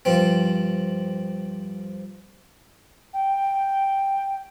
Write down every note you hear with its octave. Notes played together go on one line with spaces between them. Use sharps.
G2 F3 C4
G5